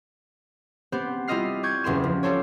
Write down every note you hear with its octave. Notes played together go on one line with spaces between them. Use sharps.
B3 C4 G4 C5
G3 E4 F4 D#5 F6 C7
D5 C#6 G6 G#6
F#1 E2 G4 C6 E7
F3
F4 G4 A4 C5 C#5